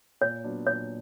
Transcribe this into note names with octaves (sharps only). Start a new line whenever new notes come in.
A#2 C#5
F#3 B3 D4
A#2 C#5